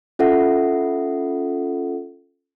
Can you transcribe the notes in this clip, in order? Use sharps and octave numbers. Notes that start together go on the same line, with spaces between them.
C#4 F4 A4 E5 F#5